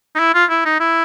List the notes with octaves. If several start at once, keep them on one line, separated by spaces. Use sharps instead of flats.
D#4
E4
F4
E4
D#4
E4